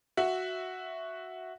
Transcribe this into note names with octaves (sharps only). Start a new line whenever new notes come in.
F#4 E5